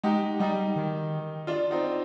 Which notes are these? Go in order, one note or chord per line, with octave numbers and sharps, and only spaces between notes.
G#3 D#4 G4
G3 D#4 G4
D#3
D4 F4
C4 D#4